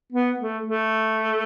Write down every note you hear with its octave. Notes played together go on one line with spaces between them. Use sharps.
B3
A3
A3